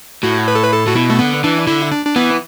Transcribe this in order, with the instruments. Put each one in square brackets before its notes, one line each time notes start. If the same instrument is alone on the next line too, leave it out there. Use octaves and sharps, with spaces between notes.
[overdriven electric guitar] A2 [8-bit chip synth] F#4
[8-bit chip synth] B4
A4
B4
A4
[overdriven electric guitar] A2 [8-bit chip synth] F#4
[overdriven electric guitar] B2 [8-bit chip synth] E4
[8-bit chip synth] A3
[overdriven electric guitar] D3 [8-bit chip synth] B3
[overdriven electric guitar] E3 [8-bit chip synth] D4
[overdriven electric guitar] D3 [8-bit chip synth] E4
[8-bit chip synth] D4
D4
[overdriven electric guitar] E3 [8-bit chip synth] B3